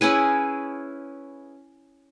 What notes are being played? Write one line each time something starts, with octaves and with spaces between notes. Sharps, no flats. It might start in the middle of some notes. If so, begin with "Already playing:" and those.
C#4 E4 G#4 B4